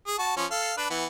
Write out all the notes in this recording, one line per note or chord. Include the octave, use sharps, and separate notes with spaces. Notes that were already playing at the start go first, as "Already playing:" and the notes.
G#4
F#4 A5
F3 C#4
A4 F5
D4 B4
E3 B3